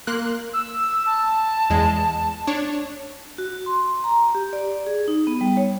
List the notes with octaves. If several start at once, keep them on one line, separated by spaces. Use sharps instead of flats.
A#3 C6 F#6
E6
A5
E2 G#3
D4 C#5
F#4
C6
A#5
G4
D5
G#4
D#4
B3
G3
C#5